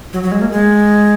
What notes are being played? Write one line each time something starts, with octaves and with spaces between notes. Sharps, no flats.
F#3
F#3
G#3
A#3
G#3